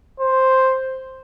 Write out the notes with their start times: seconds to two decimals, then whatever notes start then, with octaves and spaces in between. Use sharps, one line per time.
0.20 C5